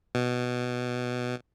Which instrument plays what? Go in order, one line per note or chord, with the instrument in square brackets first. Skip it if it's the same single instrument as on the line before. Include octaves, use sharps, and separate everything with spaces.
[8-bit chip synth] B2